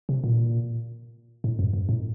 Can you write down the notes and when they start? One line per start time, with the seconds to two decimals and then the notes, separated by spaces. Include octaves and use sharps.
0.09 C3
0.24 A#2
1.44 A2
1.59 F#2
1.73 F#2
1.89 A2